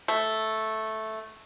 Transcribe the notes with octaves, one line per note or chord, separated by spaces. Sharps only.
A3